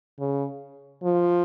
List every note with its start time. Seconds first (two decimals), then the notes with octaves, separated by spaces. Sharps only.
0.19 C#3
1.03 F3